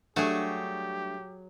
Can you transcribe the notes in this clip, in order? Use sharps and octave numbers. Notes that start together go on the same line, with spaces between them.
F#3 G3 A3 D4 G4 G#4